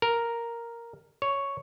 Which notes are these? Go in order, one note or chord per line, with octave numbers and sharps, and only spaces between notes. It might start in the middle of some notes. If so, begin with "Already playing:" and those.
A#4
C#5